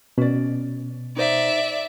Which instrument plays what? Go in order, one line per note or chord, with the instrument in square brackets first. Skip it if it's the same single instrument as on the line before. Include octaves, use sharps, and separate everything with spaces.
[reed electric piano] B2 [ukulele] C#4 D5
[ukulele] D#4 C5 F#5 [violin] D5 E5